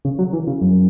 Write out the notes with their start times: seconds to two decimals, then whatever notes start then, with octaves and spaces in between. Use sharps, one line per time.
0.05 C#3
0.19 F#3
0.33 E3
0.47 C#3
0.61 F#2